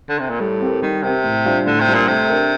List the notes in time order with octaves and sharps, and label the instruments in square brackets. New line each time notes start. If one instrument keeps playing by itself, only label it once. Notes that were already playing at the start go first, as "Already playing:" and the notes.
[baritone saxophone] D3
C3
A#2
[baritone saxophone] A2 [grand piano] G3
[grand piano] C4 G4 A#4
[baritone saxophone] D#3 [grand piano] G3
[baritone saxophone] C3 [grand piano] C4 G4 A#4
[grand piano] A2
G3 D4 F4 C5
[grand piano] A2 [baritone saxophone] D3
[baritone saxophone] C3
[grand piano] G3 D4 F4 C5
[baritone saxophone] A#2
[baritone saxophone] C3 [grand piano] A3
[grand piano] D4 G4 A#4